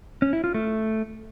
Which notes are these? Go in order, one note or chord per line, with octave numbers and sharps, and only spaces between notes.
C#4
E4
F4
A3